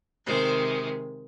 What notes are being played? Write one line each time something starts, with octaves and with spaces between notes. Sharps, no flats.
C3 D#3 G#3 C5